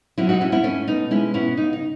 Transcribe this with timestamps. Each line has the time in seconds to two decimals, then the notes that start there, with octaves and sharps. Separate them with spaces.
0.18 F#3 C#4 E4
0.29 D#4 F#4
0.41 A3 C#4 E4
0.52 C#4 E4
0.64 A3 C#4
0.88 B2 D#4
1.11 G#3 C#4 E4
1.34 B3 C#4 E4
1.57 C#3 D#4
1.73 D#4